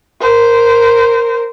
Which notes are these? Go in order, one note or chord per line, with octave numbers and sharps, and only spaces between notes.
A#4 C5